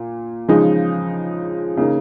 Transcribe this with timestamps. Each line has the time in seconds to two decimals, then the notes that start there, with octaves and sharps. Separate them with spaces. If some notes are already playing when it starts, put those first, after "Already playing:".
Already playing: A#2
0.48 C#3 F3 G#3 D#4
1.77 C#3 A#3 D#4